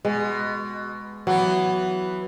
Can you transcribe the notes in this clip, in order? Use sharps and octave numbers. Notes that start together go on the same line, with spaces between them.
B2 G#3
E3 F#3 B3